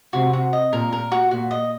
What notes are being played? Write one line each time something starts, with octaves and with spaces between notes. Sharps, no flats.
C3 F#4
F#4
D#5
A#2 A#4
A#4
F#4
A#2 F#4
D#5